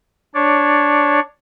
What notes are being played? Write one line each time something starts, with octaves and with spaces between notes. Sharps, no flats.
D4 C#5 D5